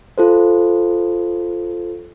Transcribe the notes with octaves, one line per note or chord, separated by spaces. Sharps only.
F4 A4 C5